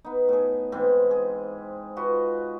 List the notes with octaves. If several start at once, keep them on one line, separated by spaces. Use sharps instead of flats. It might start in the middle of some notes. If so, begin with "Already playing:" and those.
B3 D#4
A2 G#4
G#2 E3 C4
G#4
F4 F#4 B4 D#5